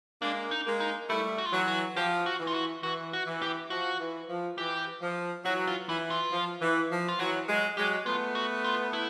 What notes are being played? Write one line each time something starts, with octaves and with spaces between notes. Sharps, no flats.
G#3 A#3 D4
D#4
G#3 A#3
D#4
G3 A3 E4
F#4
F4
E3 F#3 F#4
F#4
F3 G4
F#4
E3
F4
F#4
E3 F#4
F#4
E3
G4
F3 F#4
E3
F3
E3 G4
F3
E3 F#3 F#4
F4
E3 E4
F4
F3
E3
F3
F4
E3 F#3 F#4
F#3 G#3
F#3 G#3 G4
A3 B3 F4
F#4
F4
E4